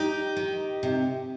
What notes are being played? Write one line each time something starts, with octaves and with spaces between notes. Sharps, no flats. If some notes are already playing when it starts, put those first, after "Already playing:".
Already playing: D#4 G4
D#3
C3